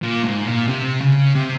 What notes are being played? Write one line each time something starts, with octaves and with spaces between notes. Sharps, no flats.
A#2
G#2
A#2
C3
C#3
C3